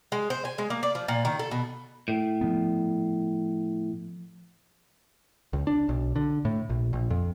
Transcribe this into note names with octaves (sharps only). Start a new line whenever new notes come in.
G#3
C5
G#5
G#3
A#3
D5
F3
A#2
D#3
A4
B2
A2
F3 B3
C#2
D4
B1
D3
A2
A#1
A#1
F2